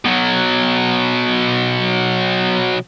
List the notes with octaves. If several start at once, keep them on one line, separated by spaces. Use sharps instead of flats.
B2 F#3